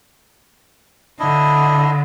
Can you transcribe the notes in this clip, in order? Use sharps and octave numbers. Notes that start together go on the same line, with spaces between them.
D3 D4 E4 D#5